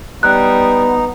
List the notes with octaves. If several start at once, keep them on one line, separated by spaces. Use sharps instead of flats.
G3 B3 D#4 F#6